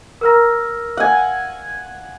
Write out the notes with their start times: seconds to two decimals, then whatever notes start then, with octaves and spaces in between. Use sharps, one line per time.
0.21 A#4 A#5 E6 F6 A#6
0.97 F#5 G#5